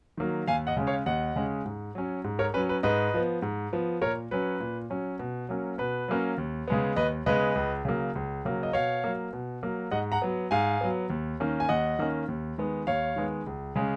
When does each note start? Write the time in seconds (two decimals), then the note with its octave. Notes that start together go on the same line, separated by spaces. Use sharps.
0.17 D#3 F#3 A#3
0.48 D#2 F5 G#5
0.67 D#5 F#5
0.77 C#3 G#3 C#4
0.87 C#5 F5
1.06 D#2 D#5 F#5
1.36 C#3 G#3 C#4
1.65 G#2
1.95 F#3 C#4
2.24 G#2
2.39 A#4 C#5
2.54 F#3 C#4 B4
2.69 B4
2.83 G#2 B4 D#5
3.14 F3 B3
3.42 G#2
3.73 F3 B3
4.01 A#2 A#4 C#5
4.31 F#3 C#4 B4
4.60 A#2
4.90 F#3 C#4
5.19 B2
5.49 F#3 A#3 C#4
5.78 B2 B4
6.08 F#3 A#3 C#4
6.38 D#2
6.68 C#3 G#3 B3
6.96 D#2 B4 D#5
7.26 C#3 G#3 B3 B4 D#5
7.55 C#2
7.85 C#3 F#3 A#3
8.15 C#2
8.45 C#3 F#3 A#3
8.63 D#5
8.73 B2 C#5 F5
9.04 F#3 A#3
9.33 B2
9.63 F#3 A#3
9.91 G#2 D#5 F#5
10.12 F#5 A#5
10.22 F#3 B3
10.51 G#2 F5 G#5
10.81 F#3 B3
11.10 D#2
11.40 D#3 A#3 C#4
11.60 G#5
11.69 D#2 D#5 F#5
11.99 D#3 A#3 C#4
12.28 D#2
12.58 D#3 G#3 B3
12.87 D#2 C#5 F5
13.16 D#3 G#3 B3
13.46 C#2
13.76 C#3 G#3 C#4